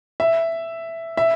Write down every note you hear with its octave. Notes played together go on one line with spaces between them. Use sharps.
E5
E5